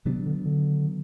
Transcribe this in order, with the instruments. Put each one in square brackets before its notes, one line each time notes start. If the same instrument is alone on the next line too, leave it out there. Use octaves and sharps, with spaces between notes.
[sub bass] C3 [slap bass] D#3 F#3 B3 D4
[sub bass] D3
D3